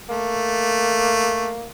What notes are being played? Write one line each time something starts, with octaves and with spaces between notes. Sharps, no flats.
A3 A#3